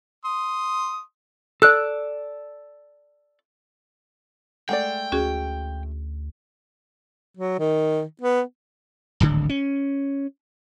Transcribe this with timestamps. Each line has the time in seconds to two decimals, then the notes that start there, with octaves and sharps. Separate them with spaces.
0.25 C6 D#6
1.62 A4 D5 E6 F#6
4.69 G#3 A3 D5 F#5 G5
5.12 D2 C#4 F#4 G#4
7.37 F#3
7.59 D#3
8.21 B3
9.20 D1 G#1 D3
9.49 C#4